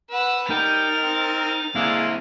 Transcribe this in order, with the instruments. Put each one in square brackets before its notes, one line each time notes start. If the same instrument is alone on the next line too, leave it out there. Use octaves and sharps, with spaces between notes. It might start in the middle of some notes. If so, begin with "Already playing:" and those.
[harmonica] B4 [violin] F#5 E6
[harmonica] G3 G5 [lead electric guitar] D#4 [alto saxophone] A#4 [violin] A6 F7
[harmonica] C4
[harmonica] D3 G#3 G#4 [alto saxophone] A#3 [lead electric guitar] C4 E4